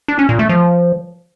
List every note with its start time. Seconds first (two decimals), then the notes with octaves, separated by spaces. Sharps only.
0.08 D4
0.19 C#4
0.29 A#2
0.39 A3
0.49 F3